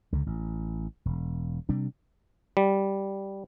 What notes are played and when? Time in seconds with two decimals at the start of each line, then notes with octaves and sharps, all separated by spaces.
0.12 C#2 D3
0.27 A1
1.05 E1
1.69 C3 G3 D4
2.57 G3